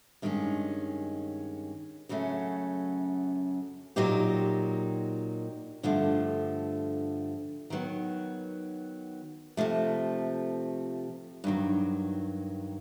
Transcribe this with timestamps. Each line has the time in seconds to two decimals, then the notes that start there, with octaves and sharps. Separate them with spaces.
0.22 G2 D#3 G#3 C#4
2.09 F#2 C#3 F#3 A3 C#4
3.96 A#2 F#3 A#3 D#4 G4
5.83 G2 D3 F3 A3
7.70 D#3 F#3 B3
9.57 C3 F3 A3
11.44 G2 D#3 F#3